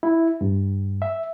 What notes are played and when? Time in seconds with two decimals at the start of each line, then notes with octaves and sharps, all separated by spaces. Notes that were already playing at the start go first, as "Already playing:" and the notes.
0.03 E4
0.41 G2
1.02 E5